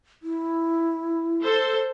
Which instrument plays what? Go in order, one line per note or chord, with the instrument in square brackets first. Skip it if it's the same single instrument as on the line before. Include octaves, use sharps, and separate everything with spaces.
[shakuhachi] E4
[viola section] A4 C5